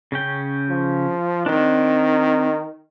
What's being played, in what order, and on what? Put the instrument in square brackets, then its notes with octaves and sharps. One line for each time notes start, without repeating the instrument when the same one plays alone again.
[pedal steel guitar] C#3 C#4 G5
[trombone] F3
[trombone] D#3 [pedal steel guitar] C4 D4